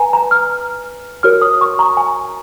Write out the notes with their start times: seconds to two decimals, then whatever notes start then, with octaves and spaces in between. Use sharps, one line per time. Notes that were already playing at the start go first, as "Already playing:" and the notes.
Already playing: B4 G#5 A#5
0.13 A#5
0.31 F6
1.23 F#4 A#4 C#5 F6
1.42 D#6
1.61 C#6
1.79 A#5
1.97 G#5